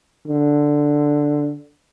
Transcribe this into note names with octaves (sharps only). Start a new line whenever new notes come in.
D3